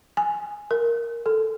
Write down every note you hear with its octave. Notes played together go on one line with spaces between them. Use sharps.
G#5
A#4
A4